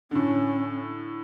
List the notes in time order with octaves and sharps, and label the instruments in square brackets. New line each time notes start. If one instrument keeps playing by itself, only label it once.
[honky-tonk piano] A2 D3 [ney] C#4